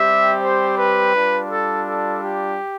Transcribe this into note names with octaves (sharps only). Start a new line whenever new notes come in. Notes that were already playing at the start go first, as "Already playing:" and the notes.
Already playing: G3 C4 G4 E5
C5
B4
G3 D4 F4
A4
A4
G4